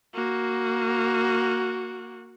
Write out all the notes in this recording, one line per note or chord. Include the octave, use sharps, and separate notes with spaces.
A#3 F#4